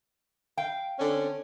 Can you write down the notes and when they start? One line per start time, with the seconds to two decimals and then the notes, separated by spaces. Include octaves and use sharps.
0.57 F5 G5
0.99 D3 C4 C#4